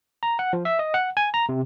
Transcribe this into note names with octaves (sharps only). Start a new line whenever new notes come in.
A#5
F#5
F3
E5
D#5
F#5
G#5
A#5
C3